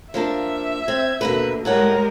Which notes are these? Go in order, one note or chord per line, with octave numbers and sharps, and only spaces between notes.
F3 A#3 D4 E5
C4 G#6
D#2 B2 D3 A#3 B4
A2 G3 G#3 A#4 C#5 F#5